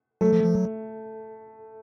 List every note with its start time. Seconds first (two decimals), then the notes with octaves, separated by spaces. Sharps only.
0.21 F#3 A3
0.33 F3
0.44 F3
0.55 F#3